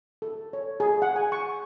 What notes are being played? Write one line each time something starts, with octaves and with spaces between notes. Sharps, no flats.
A4
C#5
G#4
F#5
G#5
C#6